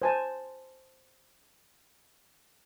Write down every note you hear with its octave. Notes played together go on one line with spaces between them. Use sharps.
C5 G#5 A5